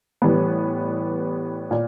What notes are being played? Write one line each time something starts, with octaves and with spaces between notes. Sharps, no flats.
A2 E3 G3 B3
A#2